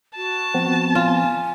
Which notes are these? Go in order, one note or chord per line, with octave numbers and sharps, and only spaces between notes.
F#4 A5
F3 B3 C4
F4 G#5